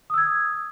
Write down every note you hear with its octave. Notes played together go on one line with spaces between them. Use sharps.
D#6 E6 G#6